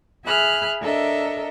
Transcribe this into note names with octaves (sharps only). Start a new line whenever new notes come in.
G#4 E5 G#5 B5 F6 F#6
D4 A4 A#4 D#5 E5